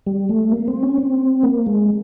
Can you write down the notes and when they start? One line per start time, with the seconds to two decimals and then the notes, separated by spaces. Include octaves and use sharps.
0.06 G3
0.29 A3
0.52 A#3
0.68 C4
0.83 C#4
0.97 C4
1.43 A#3
1.66 G#3